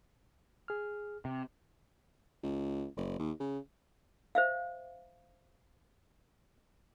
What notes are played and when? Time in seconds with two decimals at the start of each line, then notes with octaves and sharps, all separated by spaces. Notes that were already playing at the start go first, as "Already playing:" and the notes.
0.68 G#4 F6
1.25 C3
2.43 C#2
2.97 F#1
3.19 D#2
3.40 C#3
4.35 C5 E5 F5